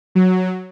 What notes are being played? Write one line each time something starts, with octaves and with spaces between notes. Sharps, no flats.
F#3